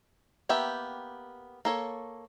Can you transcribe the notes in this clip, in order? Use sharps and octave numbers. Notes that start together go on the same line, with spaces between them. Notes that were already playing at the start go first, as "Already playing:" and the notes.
A#3 B3 G4 E5 G5
A#3 A4 C#5